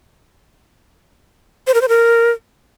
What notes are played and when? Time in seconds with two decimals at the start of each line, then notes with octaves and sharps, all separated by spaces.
1.67 C5
1.74 A#4
1.81 C5
1.89 A#4